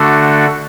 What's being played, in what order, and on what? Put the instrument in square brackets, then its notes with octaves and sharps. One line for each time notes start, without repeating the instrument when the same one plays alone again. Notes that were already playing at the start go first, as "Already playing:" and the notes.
Already playing: [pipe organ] D3 A3 D4 F#4 A4